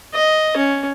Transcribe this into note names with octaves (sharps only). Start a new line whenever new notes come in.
D#5
C#4